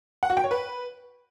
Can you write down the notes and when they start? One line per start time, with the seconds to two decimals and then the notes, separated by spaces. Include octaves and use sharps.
0.23 F#5
0.30 F#4
0.37 G5
0.44 C#5
0.51 B4